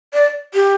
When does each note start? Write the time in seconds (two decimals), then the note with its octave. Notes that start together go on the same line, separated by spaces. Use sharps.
0.14 D5
0.54 G4